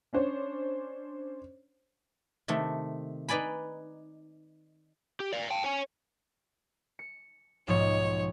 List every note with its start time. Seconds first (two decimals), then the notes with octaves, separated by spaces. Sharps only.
0.13 C#4 D4 C5 C#5
2.48 C3 D#3 A3
3.28 D#4 B4 D5 G#5 B5
5.20 G4
5.33 D5 F5
5.50 G5 A5
5.64 C#5 G#5
6.99 C#7
7.68 B1 G#2 F3 C#5